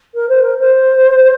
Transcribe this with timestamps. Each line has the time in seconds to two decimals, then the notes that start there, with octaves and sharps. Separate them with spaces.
0.14 A#4
0.29 C5
0.42 A#4
0.60 C5